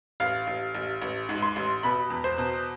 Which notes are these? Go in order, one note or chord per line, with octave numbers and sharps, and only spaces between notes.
A1 F5
A1
A1
A1
G#2
C6
A1
B2 B5
E2
C5
B2